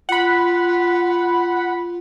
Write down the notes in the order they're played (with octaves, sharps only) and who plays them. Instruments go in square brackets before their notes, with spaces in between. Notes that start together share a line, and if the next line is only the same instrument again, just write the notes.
[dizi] F4 [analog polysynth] F#5 B5